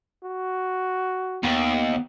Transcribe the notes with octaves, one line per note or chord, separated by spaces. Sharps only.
F#4
D#2 B3